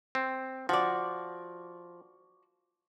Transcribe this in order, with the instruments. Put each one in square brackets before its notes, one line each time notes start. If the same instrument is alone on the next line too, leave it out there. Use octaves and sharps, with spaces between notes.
[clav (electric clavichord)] C4
[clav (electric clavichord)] F3 [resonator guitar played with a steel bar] F#4 D5